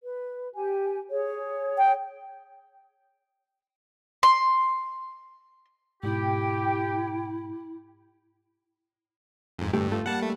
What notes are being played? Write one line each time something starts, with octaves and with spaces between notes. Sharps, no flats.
B4
G4 G#5
G#4 C#5
G5
C6
G#2 B2 E4 G4 G5
F2 G#2
D2 G2 A3 G4
A3 F4 A4
G3 A#3 F#5 A5
A3